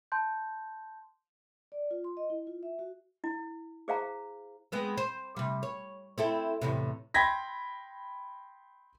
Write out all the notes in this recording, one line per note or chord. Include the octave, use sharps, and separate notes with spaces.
A5 C6 G6
D5
F4
C6
D#5
E4
F4
E5
F#4
E4
G#4 C5 F5 A#5
G#3 B3 C4
C5
C3 G3
C#5
C4 E4 A4
E2 A2 C3
G5 B5 C6 G#6 A#6 B6